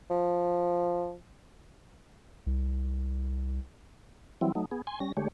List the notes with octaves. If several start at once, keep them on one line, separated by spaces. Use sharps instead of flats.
F3
C2
E3 F#3 G3 C4 E4
F#3 A3 D#4
B3 G#4
G#5 C6
G3 C#4 A#6
D3 G#3 A3 G4 C#5